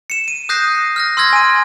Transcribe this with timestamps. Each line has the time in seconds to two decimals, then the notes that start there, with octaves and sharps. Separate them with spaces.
0.10 C#7 E7
0.28 D#7
0.49 D#6 F#6 G6 A#6 C7
0.96 F6 F#6 A#6
1.17 C6 E6 F6 G#6 A#6
1.33 G#5 D#7